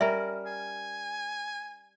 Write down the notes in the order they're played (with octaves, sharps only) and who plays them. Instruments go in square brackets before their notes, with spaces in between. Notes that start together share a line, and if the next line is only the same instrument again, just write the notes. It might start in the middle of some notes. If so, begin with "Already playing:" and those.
[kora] G3 C#4 A#4 [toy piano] E5
[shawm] G#5